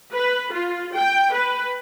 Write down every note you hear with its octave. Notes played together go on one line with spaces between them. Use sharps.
B4
F4
G5
B4